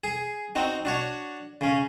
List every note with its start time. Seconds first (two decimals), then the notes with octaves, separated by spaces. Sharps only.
0.04 G#4
0.55 C4 D#4 F#4
0.85 D4 F#4 C#5
1.61 C#3 C#4